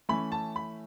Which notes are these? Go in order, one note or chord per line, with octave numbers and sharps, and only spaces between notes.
E3 A3 C#4 E4 B5
A5
B5